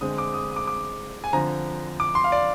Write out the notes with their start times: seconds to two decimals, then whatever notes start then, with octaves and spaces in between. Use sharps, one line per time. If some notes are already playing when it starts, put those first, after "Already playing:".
0.01 D3 G#3 C4 D#6
0.18 D6
0.34 D#6
0.51 D#6
0.56 D6
0.67 D6
1.24 G#5
1.33 D3 F3 C4 A#5
2.00 D6
2.15 C6
2.24 F5
2.32 D5